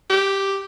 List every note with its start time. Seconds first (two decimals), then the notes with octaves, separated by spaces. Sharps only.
0.10 G4